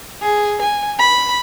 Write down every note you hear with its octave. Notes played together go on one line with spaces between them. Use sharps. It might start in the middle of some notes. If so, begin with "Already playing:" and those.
G#4
G#5
B5